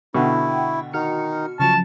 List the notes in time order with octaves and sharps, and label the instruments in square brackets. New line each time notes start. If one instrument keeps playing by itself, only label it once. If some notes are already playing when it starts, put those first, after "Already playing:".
[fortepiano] B2 D3 [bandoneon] E4 [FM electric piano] F#5 G5 C#6
[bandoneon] D#3 D#4 [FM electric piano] F#4 F6 C#7
[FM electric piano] C#3 F3 F#3 [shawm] A5 [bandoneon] C#6 F6